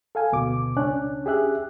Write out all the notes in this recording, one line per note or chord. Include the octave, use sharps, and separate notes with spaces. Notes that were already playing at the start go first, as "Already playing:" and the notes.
A4 F5 G#5
D2 B2 D6
C#2 C#4 D4 F#6
G4 G#4 E5 F#6